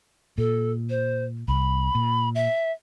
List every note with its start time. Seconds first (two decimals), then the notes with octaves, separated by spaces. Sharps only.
0.38 A#2 A4
0.90 C5
1.48 C2 B5
1.95 A#2
2.35 E5